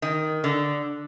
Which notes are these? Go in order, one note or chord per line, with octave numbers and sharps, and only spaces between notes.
D#3
D3